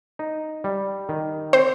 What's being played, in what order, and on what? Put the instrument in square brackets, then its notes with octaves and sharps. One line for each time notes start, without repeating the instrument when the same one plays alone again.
[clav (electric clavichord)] D#4
G3
D#3
[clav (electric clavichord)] C4 [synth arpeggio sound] C5